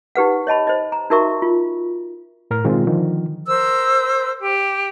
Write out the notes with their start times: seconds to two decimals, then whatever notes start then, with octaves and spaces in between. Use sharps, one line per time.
0.15 D#4 G4 B4 F#5
0.47 C#5 D#5 A5 B5
0.67 C5 D#5
0.92 A#5
1.10 D#4 F#4 A#4 E5 A#5 C#6
1.42 F4
2.51 A2 A#4 F6
2.64 B2 D#3 G#3 C4 F4
2.87 D3 D#3 F3
3.47 A#4 C5 E6
4.40 G4